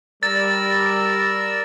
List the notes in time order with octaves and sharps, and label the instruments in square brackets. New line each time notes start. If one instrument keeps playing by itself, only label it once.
[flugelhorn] G3 [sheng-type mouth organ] A#4 D5 E6 [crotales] A6